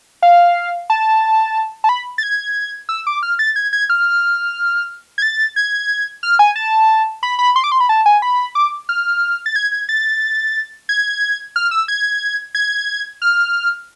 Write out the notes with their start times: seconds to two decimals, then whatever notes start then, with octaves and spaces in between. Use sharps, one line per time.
0.22 F5
0.90 A5
1.84 A5
1.89 B5
2.18 A6
2.23 G#6
2.89 E6
3.07 D6
3.23 F6
3.39 A6
3.56 G#6
3.73 G#6
3.90 F6
5.18 G#6
5.22 A6
5.56 G#6
6.23 F6
6.39 G#5
6.56 A5
7.23 B5
7.39 B5
7.56 C6
7.64 D6
7.72 C6
7.80 B5
7.89 A5
8.06 G#5
8.22 B5
8.55 D6
8.89 F6
9.46 A6
9.56 G#6
9.72 G#6
9.89 A6
10.89 G#6
11.56 F6
11.71 E6
11.88 G#6
12.55 G#6
13.22 F6